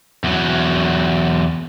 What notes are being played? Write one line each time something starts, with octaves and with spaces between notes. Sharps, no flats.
E2 F#3